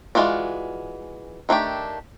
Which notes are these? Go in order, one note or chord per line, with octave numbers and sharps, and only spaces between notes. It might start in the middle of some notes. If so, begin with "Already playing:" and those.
E3 G#3 F4 F#4 D5
D#3 A3 D4 G4